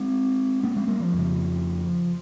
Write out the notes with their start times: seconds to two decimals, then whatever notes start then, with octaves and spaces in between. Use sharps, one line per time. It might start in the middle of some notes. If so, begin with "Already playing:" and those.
Already playing: G#3 C4
0.63 A#3 C#4
0.76 G#3 C4
0.88 G3 A#3
1.00 F3
1.14 F2 C#3